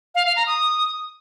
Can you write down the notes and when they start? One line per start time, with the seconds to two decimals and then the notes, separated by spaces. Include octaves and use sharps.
0.15 F5
0.26 F5
0.36 A#5
0.47 D#6